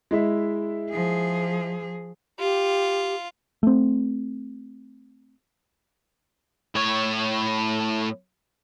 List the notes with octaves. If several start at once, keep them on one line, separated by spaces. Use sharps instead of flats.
G#3 E4 E5
F3 G#4
F4 G4
A3 C4
A2 C#5